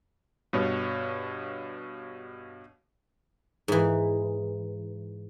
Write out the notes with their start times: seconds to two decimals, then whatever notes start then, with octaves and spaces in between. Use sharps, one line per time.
0.53 G2 B2 C#5
3.68 G#2 E3